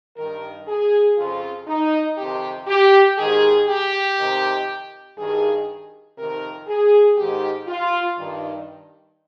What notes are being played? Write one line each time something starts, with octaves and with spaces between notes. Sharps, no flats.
G2 D#3 A#4
G#4
F2 C#3 F4
D#4
F2 C3 D#3 G4
G4
G#2 D#3 G#4
G4
F2 C3 D#3
G2 D#3 G#4
F2 C3 D#3 A#4
G#4
G#2 D#3 G4
F4
G2 D#3